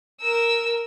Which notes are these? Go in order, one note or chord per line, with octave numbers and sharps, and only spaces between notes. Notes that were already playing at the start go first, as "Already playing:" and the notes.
A#4 E6